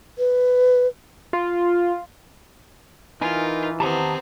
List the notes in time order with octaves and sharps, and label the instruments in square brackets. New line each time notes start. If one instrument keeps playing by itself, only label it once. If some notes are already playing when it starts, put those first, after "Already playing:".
[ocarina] B4
[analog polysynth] F4
[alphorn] E3 [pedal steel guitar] D#4 A#4 B4 [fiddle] F4 [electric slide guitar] G#5
[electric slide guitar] D#3 G4 [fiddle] B3 C4 [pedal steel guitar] A5 A#5 D#6